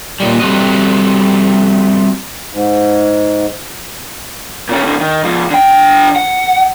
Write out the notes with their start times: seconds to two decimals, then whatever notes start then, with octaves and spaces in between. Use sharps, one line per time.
0.20 A#2 D#3 G3
0.40 G3 A3 C4 F#4 D#5
2.53 G#2
4.69 A#2 C#4
4.82 A2 D3
5.00 D#3
5.25 C#2 F3
5.51 D3 G5
6.16 F#5